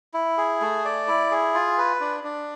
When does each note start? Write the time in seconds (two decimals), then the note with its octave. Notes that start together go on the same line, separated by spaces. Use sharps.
0.14 E4
0.38 G#4
0.61 A3
0.85 D5
1.08 E4
1.31 G#4
1.54 F4
1.78 B4
2.00 D4
2.24 D4